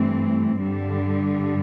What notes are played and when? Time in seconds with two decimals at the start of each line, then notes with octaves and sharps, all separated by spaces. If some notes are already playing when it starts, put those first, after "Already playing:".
Already playing: G2 E3 A3 C4
0.58 G2 D3 G3